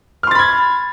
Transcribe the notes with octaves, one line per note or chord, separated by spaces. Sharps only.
B5 C6 F6 G#6 A6